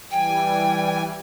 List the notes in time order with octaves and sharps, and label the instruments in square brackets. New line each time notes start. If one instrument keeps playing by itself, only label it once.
[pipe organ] E3 G3 G#5 [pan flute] G5